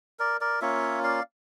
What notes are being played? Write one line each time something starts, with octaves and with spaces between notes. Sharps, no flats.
A#4 D5
A#4 D5
A#3 C#4 F4 C#5 E5
D5 F5